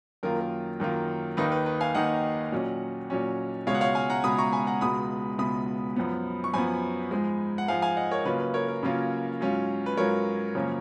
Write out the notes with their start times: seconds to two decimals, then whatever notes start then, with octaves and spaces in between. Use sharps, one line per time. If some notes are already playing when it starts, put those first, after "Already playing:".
0.23 F#2 D#3 A#3 F4 A#4
0.40 A#4
0.80 F#2 D#3 A#3 F4
1.37 D#2 D#3 A#3 D#4 B4
1.52 B4
1.66 B4
1.81 F5 G#5
1.95 D#2 D#3 A#3 D#4 D#5 F#5
2.52 A#2 F#3 C#4
3.10 A#2 F#3 C#4
3.67 C#2 B2 G#3 C#5 F5
3.75 F#5
3.81 C#5 F5
3.95 F5 G#5
4.10 F#5 A#5
4.24 C#2 B2 G#3 B5 D#6
4.38 A#5 C#6
4.52 G#5 B5
4.67 F#5 A#5
4.81 C#2 B2 G#3 B3 B5 D#6
5.38 C#2 B2 G#3 B3 B5 D#6
5.96 F#2 F3 B3
6.44 C#6
6.54 F#2 F3 B3 G#5 B5
7.11 G#2 F3 G#3
7.58 F#5
7.68 G#2 F3 G#3 F5 G#5
7.82 F5 G#5
7.97 D#5 F#5
8.11 A#4 C#5
8.25 C#3 F#3 A#3 C#4 F4 B4
8.40 B4
8.54 A#4 C#5
8.68 A#4
8.83 C#3 F#3 A#3 C#4 F4
9.40 G#2 F#3 C#4 F4
9.86 B4
9.97 G#2 F#3 C#4 F4 A#4 C#5
10.55 F#2 C#3 F3 A#3 C#4